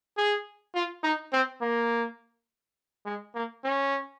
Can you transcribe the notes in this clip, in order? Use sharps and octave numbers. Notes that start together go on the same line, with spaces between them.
G#4
F4
D#4
C4
A#3
G#3
A#3
C#4